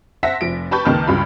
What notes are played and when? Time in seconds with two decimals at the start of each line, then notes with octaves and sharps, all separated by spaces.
0.23 C5 E5 F#5 A5 A#6 B6
0.41 F1 F3 D7
0.71 G4 B4 A5 B5 C#6 G6
0.85 C#2 D#3 A#3 B4 A5 F6
1.07 C#2 G2 F4 B5